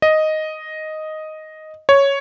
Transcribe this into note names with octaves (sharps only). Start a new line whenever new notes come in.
D#5
C#5